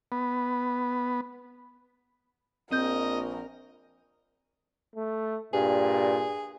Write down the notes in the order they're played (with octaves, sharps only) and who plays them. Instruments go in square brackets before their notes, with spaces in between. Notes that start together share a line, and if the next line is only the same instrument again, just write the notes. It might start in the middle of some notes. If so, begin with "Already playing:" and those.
[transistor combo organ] B3
[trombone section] A#1 [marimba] C4 G6 [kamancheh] A#4 [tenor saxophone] D#5
[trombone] A3
[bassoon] G2 [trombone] A#2 [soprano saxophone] G#4